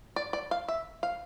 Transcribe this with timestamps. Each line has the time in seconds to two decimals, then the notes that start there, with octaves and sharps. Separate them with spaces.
0.16 D5
0.33 D5
0.51 F5
0.68 E5
1.03 F5